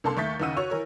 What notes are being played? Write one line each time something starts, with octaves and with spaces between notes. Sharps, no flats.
C2 A#3 D4 A4 A5 C6
D#2 A3 C#6 G6 A6 B6
D#2 C#3 D#4 F#5 E6 D#7
F#4 C#5 C#6 F7
E3 A#4 C#5